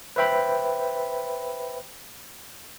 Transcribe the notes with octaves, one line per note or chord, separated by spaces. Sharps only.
B4 C5 E5 G5 B5